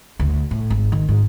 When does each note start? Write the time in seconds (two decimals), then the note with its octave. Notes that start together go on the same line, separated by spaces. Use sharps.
0.20 D2
0.51 A2
0.70 G#1
0.92 D#3
1.09 G#2